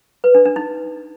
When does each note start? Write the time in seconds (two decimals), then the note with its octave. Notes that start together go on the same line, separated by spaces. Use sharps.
0.24 B4
0.35 D4
0.45 D4
0.56 D#4